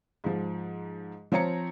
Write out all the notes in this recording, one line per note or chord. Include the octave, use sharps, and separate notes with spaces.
G#2 F3
F3 C4 C#5 A#5 C#7